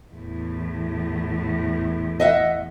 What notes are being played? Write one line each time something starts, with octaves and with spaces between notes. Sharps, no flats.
E2 A2
D#5 E5 F#5